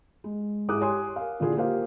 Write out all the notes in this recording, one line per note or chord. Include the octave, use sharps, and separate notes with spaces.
G#3
G#2 E4 G#4 D6 D#6 F#6
G4 C#5 G#5 C6 D#6
A#4 F5
A#2 D3 E3 F4 G#4
A#3 G4 C5 F5